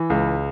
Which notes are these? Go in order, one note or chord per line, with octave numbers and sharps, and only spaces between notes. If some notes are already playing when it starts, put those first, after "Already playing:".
Already playing: E3
C#2